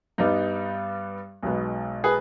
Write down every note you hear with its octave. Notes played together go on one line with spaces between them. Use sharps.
G2 G3 B3 D#4
B1 B2 G#3 B3
G#4 B4